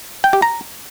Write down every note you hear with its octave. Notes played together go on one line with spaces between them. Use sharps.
G5
G4
A#5